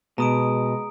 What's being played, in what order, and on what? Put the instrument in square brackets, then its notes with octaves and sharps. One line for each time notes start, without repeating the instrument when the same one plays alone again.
[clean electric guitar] B2 [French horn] G#3 [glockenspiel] A#5 D#6 D7